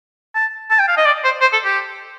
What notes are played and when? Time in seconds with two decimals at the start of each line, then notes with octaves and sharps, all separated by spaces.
0.35 A5
0.70 A5
0.79 G5
0.88 F5
0.97 D#5
1.06 D5
1.24 C5
1.41 C5
1.53 A4
1.64 G4